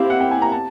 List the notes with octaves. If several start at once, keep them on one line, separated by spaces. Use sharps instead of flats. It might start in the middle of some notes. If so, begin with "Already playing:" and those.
Already playing: C4 E4 G4 F5
F#5
G5
G#5
A#5
A5